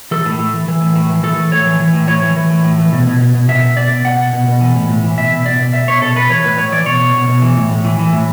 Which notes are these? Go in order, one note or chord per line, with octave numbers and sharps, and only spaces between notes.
E3 A4
A2
A2
E3
E3
A2
A2
E3
E3 A4
A2
A2 C#5
E3
E3
A2
A2 C#5
E3
E3
A2
A2
E3
B2
B2
B2
B2
B2 E5
B2
B2 D5
B2
B2 F#5
B2
B2
B2
E3
A2
A2
E3
B2 E5
B2
B2 D5
B2
B2 E5
B2 C#5
B2 A4
B2 B4
E3 C#5
A2 B4
A2 C#5
E3 D5
B2 C#5
B2
B2
B2
E3
A2
A2
E3
E3
A2